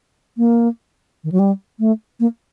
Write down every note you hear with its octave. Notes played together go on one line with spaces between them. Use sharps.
A#3
D#3
F#3
G3
A3
A#3